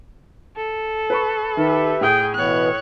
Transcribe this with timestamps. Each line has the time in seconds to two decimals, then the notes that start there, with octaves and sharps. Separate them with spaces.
0.56 A4
1.10 B4 B5 C#6
1.57 D#3 G4 B4 E5
2.01 A2 G#4 G5 D#6
2.35 B2 E3 B3 C#5 F#6